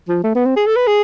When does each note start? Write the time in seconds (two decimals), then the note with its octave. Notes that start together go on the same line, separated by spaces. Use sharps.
0.09 F3
0.24 A3
0.35 B3
0.46 C4
0.57 G#4
0.67 A4
0.77 B4
0.87 G#4